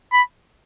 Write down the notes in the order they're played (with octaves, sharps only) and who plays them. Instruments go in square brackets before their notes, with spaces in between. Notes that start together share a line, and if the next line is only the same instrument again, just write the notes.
[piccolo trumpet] B5